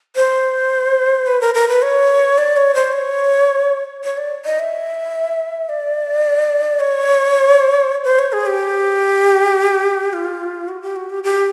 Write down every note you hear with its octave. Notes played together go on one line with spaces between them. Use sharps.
C5
B4
A#4
A#4
B4
C#5
D5
C#5
C5
C#5
C#5
D5
D#5
E5
D5
C#5
C5
C#5
G#4
G4
F4
F#4
G4
F#4
G4
G4